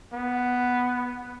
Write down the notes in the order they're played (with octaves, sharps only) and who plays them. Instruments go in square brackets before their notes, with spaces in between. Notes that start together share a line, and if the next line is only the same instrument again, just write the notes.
[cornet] B3